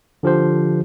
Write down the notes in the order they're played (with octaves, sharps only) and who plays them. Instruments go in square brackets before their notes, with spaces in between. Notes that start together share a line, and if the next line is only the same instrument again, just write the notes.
[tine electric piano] D3 F3 G4 C5